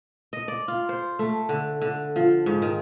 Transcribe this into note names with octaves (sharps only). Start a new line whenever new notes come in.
D#5
D5
F4
C5
A3
D3
D3
F3
G#2
D#3